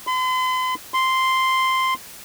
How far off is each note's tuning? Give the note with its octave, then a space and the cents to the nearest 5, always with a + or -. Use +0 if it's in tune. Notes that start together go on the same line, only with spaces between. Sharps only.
C6 -45
C6 -5